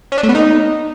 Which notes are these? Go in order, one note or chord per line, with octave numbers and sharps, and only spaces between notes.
C#4
D4
A3
B3
D#4